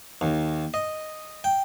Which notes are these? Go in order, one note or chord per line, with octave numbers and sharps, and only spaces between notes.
D#2
D#5
G5